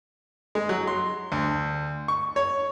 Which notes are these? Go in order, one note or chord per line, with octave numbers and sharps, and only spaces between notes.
G#3
F#3
C6
D2
C#6
C#5